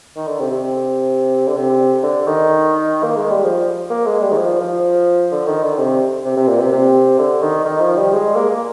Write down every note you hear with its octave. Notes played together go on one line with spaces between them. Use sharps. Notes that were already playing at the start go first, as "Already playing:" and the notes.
D#3
D3
C3
C3
D3
C3
D3
D#3
A#3
G#3
G3
F3
A#3
G#3
G3
D#3
F3
F3
D3
D#3
D3
C3
C3
C3
A#2
C3
C3
D3
D#3
D#3
F3
G3
G#3
A#3
A#3